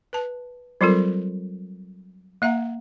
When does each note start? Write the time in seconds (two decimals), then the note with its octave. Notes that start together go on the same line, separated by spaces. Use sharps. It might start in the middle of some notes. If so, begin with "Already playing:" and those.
0.13 B4 A5
0.81 F#3 G3 C4 F4 A4 A#4
2.42 A#3 E5 F#5 A#5